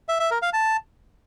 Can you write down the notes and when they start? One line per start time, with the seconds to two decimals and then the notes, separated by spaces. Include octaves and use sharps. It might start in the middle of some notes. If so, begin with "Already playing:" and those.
0.09 E5
0.20 E5
0.31 A#4
0.42 F5
0.53 A5